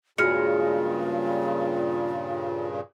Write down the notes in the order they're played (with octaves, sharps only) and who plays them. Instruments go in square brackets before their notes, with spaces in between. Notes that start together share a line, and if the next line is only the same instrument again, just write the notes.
[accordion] G2 A#2 C#3 [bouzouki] G#3 [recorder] F4 [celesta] F#4 F6 C#7